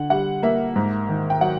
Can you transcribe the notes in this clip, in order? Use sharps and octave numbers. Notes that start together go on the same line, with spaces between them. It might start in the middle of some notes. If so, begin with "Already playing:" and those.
Already playing: D3 F#5
G3 F#5
A#3 E5
G#2
D#3
G5
F#3 F#5